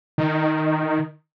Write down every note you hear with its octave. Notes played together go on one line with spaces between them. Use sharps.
D#3